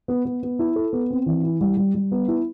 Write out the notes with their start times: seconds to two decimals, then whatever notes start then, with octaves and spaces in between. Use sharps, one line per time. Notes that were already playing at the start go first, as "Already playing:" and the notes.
0.08 B3
0.25 B3
0.43 B3
0.59 E4
0.76 A4
0.93 B3
1.10 C4
1.26 E3
1.43 E4
1.61 G3
1.77 G3
1.95 G3
2.12 B3
2.28 E4